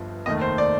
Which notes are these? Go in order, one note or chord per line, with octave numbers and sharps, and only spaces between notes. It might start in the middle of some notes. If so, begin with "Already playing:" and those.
Already playing: G1 G2 F3
F1 D#2 D#3 A3 D#5
C5
D5